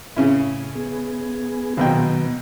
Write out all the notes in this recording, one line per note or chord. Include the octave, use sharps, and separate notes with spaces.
A2 C#3 C#4 E4
B3 G#4
A#1 B2 D#3 F#3 B3 G5